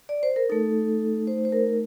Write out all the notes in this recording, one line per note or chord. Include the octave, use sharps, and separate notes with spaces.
D5
C5
A#4
A3 D#4 A4
C5
C5
A#4